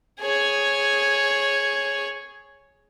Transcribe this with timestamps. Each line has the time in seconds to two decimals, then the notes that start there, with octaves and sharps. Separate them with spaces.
0.20 G#4 C#5